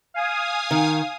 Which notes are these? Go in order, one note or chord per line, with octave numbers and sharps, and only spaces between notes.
F5 G#5 D#6
D#3